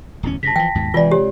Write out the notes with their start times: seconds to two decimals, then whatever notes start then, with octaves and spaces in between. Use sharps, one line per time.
0.23 D1 E2 C#4
0.43 G2 C#3 A5 A#6 B6
0.56 E3 F3 G5
0.75 D#2 G#2 B2
0.94 C3 E3 G#3 F4 D5
1.11 G4 C#5